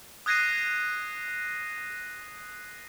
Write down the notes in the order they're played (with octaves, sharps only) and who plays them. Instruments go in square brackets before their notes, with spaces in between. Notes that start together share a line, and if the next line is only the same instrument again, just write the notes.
[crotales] D#6 F#6 G#6 A#6 C7 D#7